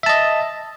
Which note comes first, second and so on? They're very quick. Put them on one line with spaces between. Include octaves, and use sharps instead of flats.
E5 A5 D#5